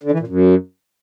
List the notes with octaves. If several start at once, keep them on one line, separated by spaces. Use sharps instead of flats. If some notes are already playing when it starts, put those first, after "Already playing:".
D3
E3
A#2
F#2